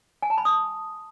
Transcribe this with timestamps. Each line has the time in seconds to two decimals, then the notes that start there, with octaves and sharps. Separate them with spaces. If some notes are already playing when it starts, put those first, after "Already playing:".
0.22 G#5
0.30 A5
0.38 B5
0.45 D#6